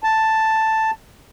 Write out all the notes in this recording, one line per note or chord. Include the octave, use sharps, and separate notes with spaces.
A5